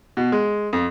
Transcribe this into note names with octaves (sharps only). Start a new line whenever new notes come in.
B2
G#3
F2